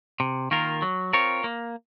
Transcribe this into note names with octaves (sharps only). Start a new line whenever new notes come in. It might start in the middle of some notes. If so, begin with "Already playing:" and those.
C3
D#3 A#3 F4 A#4
F#3
C4 F4 A#4 C#5
A#3